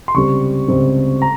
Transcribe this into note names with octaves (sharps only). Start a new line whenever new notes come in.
C6
C#2 C3 G3 C4 C#6
C#2 C3 G3 C4
A#5